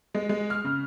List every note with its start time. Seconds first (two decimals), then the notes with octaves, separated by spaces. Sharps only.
0.14 G#3
0.29 G#3
0.50 F6
0.64 C#3